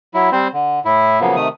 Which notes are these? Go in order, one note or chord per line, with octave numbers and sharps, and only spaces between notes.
F#3 E4
G3 C4 C5
D3
A2 E4
C#3 F3 F#3 A#3 B3
C3 D#3 A3 D#6